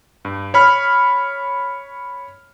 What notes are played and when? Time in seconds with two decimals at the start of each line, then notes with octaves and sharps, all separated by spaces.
0.25 G2
0.54 C#5 B5 F6